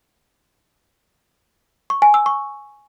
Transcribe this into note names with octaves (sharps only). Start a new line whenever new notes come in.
C#6
G#5
E6
C#6